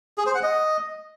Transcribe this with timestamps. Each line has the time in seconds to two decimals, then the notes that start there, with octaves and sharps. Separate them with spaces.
0.18 G#4
0.26 C5
0.35 F#5
0.43 D#5